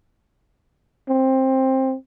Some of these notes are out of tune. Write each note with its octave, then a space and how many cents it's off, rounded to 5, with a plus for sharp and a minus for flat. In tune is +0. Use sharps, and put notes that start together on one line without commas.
C4 +15